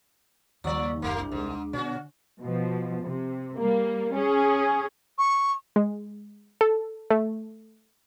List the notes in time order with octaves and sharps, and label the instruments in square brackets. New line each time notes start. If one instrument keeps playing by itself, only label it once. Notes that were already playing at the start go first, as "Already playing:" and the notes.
[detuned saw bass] D#2 [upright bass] C#3 G3 [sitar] F3 D5 [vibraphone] A#5 C#6 E6
[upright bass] F#1 [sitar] A3 A#3 [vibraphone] C6
[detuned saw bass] C2 [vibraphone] D4
[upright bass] D#2 G#3 [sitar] G#2
[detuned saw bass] B2 [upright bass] D3 [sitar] C#4 F#4
[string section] B2 F3
C3
G3 A#3
C#4 G#4
[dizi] C#6
[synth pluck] G#3
A4
A3